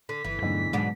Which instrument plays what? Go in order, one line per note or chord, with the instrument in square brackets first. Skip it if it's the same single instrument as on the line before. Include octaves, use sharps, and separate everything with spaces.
[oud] D3 [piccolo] B6
[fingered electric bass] G1 [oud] E3
[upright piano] E1 D3 D#4 [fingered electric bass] G2 F#3 A3
[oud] G#2 B2 D4 [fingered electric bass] F#3 G#3